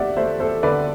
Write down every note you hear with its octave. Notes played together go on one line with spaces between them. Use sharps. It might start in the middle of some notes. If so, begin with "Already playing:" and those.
Already playing: D2 G4 D5 E5 F#5
A3 C5 E5
A4 C5
D3 B4 D5